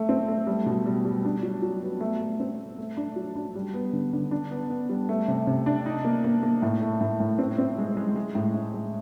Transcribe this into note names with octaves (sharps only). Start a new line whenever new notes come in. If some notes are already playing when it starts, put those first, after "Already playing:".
Already playing: A3
C4
A3
G3
B2
G3
G3
D4
F#3
F#3
B3
A3
A3
C4
A3
A3
D4
F#3
D4
G3
B3
D3
D3
D4
B3
B3
G3
A3
C3
C3
D4
D#4
A#3
A#3
A#3
A2
A3
A2
A2
C4
C4
G#3
G#3
G#3
A2
A2
G#3